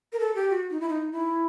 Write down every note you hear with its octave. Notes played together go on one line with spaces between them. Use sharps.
A#4
A4
G4
F#4
D#4
E4
D#4
E4